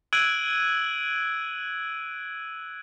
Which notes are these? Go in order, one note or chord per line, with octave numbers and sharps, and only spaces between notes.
E6 F#6 G#6 D7 D#7 F#7